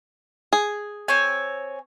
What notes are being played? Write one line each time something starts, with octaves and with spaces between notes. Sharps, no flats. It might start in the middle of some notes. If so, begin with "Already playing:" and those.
G#4
C4 C#5 G#5